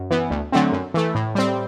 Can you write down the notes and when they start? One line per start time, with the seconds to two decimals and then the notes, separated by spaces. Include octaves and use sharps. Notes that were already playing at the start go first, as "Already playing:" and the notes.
Already playing: F#2
0.11 E3 B3
0.31 D2
0.52 D3 F#3 A3 C4
0.72 F#2
0.94 E3 A3
1.15 A2
1.35 G3 C4